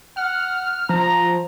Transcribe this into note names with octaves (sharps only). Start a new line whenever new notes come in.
F#5 F6
F3 A#5